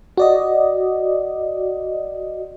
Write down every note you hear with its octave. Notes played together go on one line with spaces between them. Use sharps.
F#4 D5 D#5